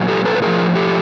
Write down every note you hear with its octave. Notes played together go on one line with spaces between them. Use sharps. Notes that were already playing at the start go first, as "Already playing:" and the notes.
Already playing: A#2 F#3
G4 A4
A4 B4
B4
A2 F3 G#4 A#4
G4 A4